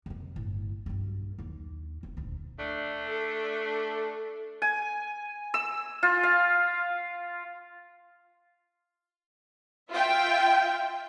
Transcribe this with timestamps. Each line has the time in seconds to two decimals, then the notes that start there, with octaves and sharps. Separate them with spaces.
0.06 F2 C3
0.36 G1 A2
0.86 B1 G2
1.38 D#2 A#3
2.03 F1
2.17 D#1 D2
2.60 A3 D4
3.07 A4
4.62 G#5
5.54 E6
6.03 F4
6.23 F5
9.90 F4 E5 G5